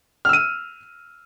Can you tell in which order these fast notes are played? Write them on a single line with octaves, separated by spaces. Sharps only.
F6 E6 D#7